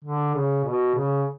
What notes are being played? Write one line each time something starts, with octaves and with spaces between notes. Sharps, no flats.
D3
C#3
B2
C#3